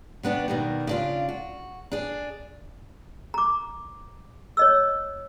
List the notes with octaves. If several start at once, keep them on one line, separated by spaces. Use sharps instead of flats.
C3 B3 D4 F#4
B2 D#3 G3
C#3 D4 F4
F#4
D4 G#4
A#5 D6
C#5 D#5 E6